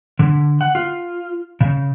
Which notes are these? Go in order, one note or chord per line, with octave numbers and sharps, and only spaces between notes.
D3
F#5
F4
C#3